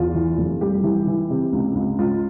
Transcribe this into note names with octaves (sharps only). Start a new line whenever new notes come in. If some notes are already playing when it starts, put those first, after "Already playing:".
Already playing: E2 F4
E3
F1
G3 G4
E3
E3
C3
C#2
C#2
C#2 F4